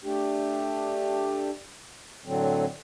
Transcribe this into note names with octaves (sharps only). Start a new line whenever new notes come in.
A3 D4 G4
A2 D3 F#3 C4